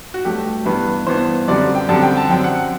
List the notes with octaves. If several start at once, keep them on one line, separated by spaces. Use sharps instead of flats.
F#4
G2 F#3 A3 G4
G2 E3 B3 B4
G2 E3 B3 C5
F#2 D3 G3 C4 D5
G5
F#2 D3 G3 C4 A5
G5
A5
F#2 F#3 C4 G5
F#5